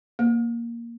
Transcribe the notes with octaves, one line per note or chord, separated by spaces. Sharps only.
A#3